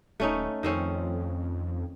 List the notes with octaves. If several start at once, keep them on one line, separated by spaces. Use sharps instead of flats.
D#1 A3 C#4 D#4
F2 D#3 C4 C#4